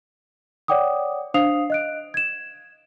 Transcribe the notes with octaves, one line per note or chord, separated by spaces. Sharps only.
C#5 D5 F#5 G5 D6 D#6
D4 C5 F5 D#6 C7 F7
D#5 F#6 D7
G#6 E7